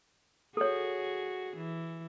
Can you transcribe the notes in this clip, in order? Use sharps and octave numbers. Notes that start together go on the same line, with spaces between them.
F#4 G#4 A4 C#5
E3